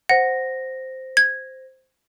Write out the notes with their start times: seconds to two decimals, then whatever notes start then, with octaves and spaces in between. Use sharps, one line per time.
0.09 C5 F#5 A#6
1.17 G#6